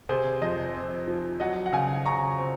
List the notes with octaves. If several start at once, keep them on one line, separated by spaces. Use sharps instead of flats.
C3 G#4 C5
F2 C5 D#5
C4
F3
F#3 D#5 F#5
F#5
C#3 F5 G#5
C#3 A#5 C#6
C4